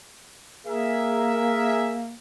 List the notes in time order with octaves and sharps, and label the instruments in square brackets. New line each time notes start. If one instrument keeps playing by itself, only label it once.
[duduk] A#3 [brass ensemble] G#4 A#4 E5